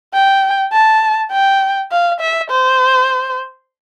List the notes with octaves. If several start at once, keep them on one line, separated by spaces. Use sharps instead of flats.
G5
A5
G5
F5
E5
C5